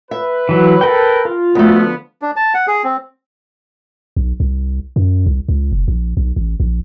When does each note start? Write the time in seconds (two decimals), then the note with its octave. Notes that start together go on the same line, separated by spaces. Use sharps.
0.11 B4 E5
0.49 E3 F#3
0.81 A4 A#4 G5
1.25 F4
1.55 D2 D3 F3 A3 B3
2.22 D4
2.36 A5
2.54 F#5
2.67 G#4
2.84 C4
4.16 B1
4.40 C2
4.96 F#2
5.26 C2
5.48 C#2
5.72 F1
5.88 A#1
6.17 B1
6.36 A1
6.60 A#1